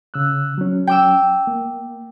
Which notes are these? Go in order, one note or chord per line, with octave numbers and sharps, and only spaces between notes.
C#3 E6 F#6
F#3 C#4
G5 D6 E6
A#3